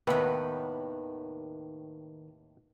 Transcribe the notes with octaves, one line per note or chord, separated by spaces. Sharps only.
D#2 A2 C3 D#3 B3 B4